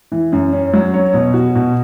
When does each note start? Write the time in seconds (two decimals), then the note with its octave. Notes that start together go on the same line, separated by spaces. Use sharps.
0.12 E3
0.32 F#2
0.53 C#4
0.73 F#3
0.94 C#5
1.14 B2
1.34 F#4
1.55 B2